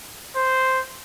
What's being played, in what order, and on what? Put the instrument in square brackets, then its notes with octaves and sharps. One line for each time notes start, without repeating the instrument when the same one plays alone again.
[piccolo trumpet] C5